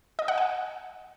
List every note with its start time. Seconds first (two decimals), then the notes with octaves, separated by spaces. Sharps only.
0.19 D#5
0.28 F#5
0.38 G#5